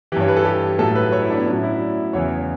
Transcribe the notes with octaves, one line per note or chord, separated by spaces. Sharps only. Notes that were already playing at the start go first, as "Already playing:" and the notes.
G2 E3 G4 C#5
B4
A4
G4
A2 F#3 A4
B4
C#5
E4
D4
B3
A2 F#3 C#4
E4
D5
E2 C#3 E3 C#5